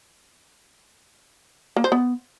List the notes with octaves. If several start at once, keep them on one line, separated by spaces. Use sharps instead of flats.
A#3
C5
B3